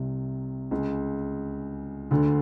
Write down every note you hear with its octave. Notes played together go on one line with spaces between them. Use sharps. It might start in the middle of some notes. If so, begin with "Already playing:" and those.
Already playing: C2 C3
C#2 C#3
D2 D3